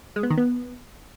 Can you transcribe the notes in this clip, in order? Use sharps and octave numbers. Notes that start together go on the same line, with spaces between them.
G#3
B3
D#3
B3